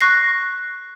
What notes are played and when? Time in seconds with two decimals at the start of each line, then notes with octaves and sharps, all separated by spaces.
0.01 C#6 F#6 A#6 C7